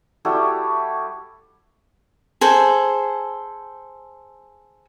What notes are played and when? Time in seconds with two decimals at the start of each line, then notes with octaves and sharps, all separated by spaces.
0.25 G3 E4 F#4 A4
2.41 G#4 A4 C5